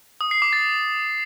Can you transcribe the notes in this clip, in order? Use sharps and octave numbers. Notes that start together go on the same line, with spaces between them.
D#6
C7
D6
A6